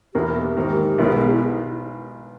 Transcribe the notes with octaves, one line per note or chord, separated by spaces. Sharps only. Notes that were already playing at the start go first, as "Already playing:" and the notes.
E2 B2 A#3 G4
G#2 D#3 A#3 G4
B1 B2 G#3 B3 A#4
G#4
G4
E4